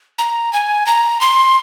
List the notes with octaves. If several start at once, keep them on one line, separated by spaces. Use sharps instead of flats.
A#5
G#5
A#5
C6